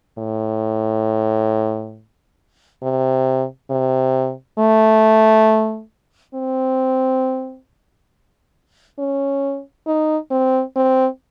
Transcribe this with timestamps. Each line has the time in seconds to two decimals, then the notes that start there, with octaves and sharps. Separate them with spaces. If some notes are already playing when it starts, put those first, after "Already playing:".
0.18 A2
2.83 C3
3.70 C3
4.59 A3
6.34 C4
8.99 C#4
9.87 D#4
10.31 C4
10.76 C4